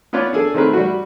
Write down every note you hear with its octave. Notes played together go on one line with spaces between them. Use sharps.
B3 C#4 F4 B4 C#5 D5
D4 G#4 A4
D#3 A3 C4 G#4 A#4 B4
G3 F#4